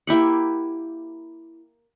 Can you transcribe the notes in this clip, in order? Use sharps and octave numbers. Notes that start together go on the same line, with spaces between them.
A#3 E4 G4 F#5